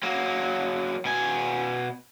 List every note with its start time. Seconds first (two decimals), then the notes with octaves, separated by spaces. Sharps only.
0.03 F#3 A#3
1.05 B2 G#5